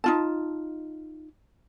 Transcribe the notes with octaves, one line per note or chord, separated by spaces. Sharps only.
D#4 F4 A5